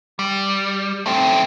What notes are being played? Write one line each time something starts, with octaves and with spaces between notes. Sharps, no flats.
G3
A3 C4